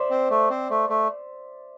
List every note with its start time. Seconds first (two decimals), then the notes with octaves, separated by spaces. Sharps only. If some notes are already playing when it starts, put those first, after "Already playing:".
Already playing: C5 D5 E5
0.10 C4
0.30 A3
0.50 C4
0.70 A3
0.89 A3